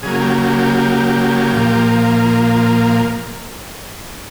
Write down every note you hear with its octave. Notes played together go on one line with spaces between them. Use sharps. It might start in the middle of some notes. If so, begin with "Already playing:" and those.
C#3 F#3 A#3 G#4
G4
G4
G4
G4
A#2 F3 A#3